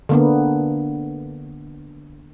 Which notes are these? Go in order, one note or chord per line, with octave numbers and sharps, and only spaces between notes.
D3 A#3 B3